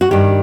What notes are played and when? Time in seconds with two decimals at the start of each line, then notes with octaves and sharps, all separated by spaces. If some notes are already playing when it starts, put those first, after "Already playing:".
0.01 F#4
0.11 G2 D#3 G4